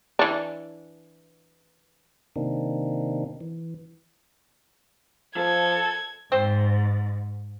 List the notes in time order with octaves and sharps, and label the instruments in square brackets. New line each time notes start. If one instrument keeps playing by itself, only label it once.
[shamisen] E3 D4
[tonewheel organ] C3 D#3 A#3 C4 D4 D#4
E3
[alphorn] F3 [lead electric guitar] A4 [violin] G#6
[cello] G#2 [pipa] C4 C5